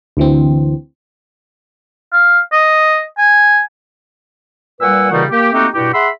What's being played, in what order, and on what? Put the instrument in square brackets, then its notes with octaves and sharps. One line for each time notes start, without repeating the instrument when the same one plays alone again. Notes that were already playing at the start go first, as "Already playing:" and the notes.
[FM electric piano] D2 E3 C4
[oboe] F5
D#5
G#5
[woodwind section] A#2 G3 B4 F#5 G#5 E6
A#2 C#3 E3 G3 D#4 F#4
A#3 G4
A3 A#3 C4 D#4 F#4 G4
G2 B2 E4 F#4 G4
G#4 E5 F#5 B5 C6 E6